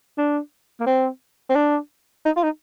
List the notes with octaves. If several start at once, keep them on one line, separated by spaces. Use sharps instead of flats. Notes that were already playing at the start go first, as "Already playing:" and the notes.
D4
A#3
C4
C4
D4
D#4
F4
D#4